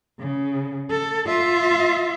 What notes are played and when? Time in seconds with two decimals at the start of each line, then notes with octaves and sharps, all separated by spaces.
0.19 C#3
0.91 A4
1.26 F4 E5